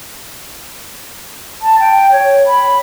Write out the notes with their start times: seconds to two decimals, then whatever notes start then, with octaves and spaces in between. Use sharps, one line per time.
1.62 A5
1.80 G5
2.12 C#5
2.47 B5